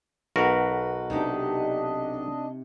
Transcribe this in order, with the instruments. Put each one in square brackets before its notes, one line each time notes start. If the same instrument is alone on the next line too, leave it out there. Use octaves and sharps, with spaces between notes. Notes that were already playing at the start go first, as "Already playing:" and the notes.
[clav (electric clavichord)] B1 F#4 A#4 [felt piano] B4
[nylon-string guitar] C3 D#4 G4 [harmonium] D4 D#5